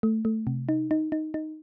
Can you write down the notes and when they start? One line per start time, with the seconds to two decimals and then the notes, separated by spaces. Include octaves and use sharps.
0.03 A3
0.25 A3
0.47 C3
0.69 D#4
0.91 D#4
1.12 D#4
1.34 D#4